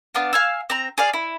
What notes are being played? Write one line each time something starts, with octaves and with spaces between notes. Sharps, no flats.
B3 D4 F5
F5 G#5 E6
C4 A#5
G#4 D5 F5
E4